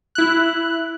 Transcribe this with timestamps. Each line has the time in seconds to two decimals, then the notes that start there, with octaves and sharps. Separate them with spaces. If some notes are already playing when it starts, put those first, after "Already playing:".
0.15 E4 F#6